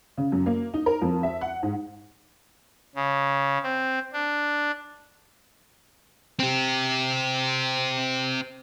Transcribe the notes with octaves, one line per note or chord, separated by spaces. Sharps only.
C#3
F#2
A#3
D#4
A#4
F2
E5
F#5
G#2
C#3
C4
D4
C4 G4